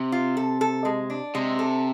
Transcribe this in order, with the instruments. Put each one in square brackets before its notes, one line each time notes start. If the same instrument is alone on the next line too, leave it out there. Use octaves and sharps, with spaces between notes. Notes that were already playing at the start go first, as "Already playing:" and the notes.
Already playing: [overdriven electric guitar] C3
[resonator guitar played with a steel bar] F4
A4
A4
G#3
D4
[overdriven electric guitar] C3 [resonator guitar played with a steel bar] G#3
[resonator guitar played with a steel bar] A4